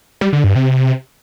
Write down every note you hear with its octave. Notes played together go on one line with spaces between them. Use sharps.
G3
D3
G2
C3